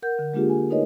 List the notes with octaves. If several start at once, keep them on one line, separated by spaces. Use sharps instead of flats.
A#4 F#5 G6
D3
G#3 A#3 D4 F4 G4 G#4
G#5
A3 D#4 A#4 B4 C#5 D#5